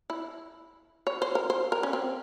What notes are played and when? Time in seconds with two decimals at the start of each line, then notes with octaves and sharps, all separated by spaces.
0.10 E4
1.07 C#5
1.22 C5
1.35 A#4
1.50 C5
1.72 A#4
1.83 C#4
1.93 C4